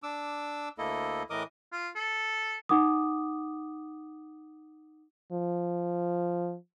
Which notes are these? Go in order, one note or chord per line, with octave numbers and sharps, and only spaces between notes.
D4 D6 E6
D2 A#3 E4 A4 D#5
A2 E3 A#4 D#5 D6 D#6
F4
A4
D#4 F#5 D6 D#6
F3